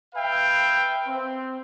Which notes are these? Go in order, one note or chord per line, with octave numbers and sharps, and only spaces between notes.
B4 E5 F5 G5
C4